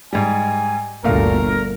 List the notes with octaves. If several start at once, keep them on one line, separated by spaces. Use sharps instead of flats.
G#2 G3 G#5
G1 D2 A#2 A3 A#4 F5